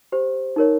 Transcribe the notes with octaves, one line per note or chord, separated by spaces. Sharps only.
G4 C5
D#4 A#4 C#5